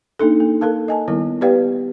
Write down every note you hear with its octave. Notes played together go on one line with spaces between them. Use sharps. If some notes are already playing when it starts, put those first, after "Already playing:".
A#3 D4 D#4 A4
A#3
A4 A#4 F5 A5
D#5 G#5 A5
D#3 G3 B3 E4 A#4
B3 G4 B4 D5 F5 G5